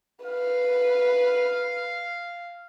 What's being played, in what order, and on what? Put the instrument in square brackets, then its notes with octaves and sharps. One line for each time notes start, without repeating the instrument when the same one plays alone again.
[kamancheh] B4 [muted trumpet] F5